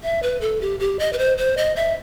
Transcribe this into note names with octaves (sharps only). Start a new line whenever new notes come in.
E5
B4
A4
G4
G4
D#5
B4
C5
C5
D#5
E5